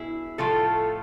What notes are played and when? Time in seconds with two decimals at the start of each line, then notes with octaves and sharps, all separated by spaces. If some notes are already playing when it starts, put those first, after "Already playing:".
Already playing: B2 E4 G#4
0.38 A2 F3 A3 F4 A4